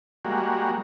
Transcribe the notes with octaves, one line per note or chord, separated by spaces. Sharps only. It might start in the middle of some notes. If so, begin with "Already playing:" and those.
G3 G#3 A#3 F#4